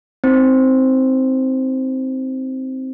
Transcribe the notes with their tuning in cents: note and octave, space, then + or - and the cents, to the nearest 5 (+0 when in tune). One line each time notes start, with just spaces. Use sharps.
C4 +0 D#4 +30 C5 +0